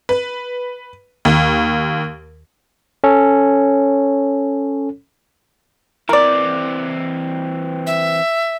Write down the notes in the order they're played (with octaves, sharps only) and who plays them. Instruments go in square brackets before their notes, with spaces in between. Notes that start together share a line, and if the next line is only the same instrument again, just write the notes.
[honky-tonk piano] B4
D#2
[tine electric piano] C#4 A4 C#5
[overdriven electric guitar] E3 C4 [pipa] A#4 D5
[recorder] E5